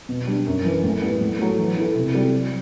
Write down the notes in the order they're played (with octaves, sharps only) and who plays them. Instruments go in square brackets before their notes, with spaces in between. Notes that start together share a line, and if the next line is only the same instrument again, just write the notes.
[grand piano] B2
G3 D4
F#2
E3 B3
A2
G3 B3 E4
A2
F#3 A3
E3
B3 E4 A4
C3
G3 C4 F#4 A4
F#3